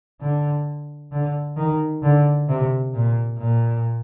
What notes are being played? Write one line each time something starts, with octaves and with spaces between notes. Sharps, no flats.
D3
D3
D#3
D3
C3
A#2
A#2